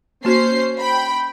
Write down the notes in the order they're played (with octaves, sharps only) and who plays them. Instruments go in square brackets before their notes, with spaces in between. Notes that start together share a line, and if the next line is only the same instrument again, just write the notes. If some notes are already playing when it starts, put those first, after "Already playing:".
[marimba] A#3 F#4 [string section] C#4 C5 C7
[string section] G5 B5